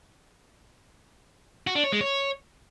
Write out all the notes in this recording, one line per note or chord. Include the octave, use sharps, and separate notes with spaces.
F#4
D4
C#5
G#3
C#5